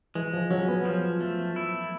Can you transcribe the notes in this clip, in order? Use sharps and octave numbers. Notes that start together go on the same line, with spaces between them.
E3 G#3
F3
F#3 C#4
B3
F3
A3
E4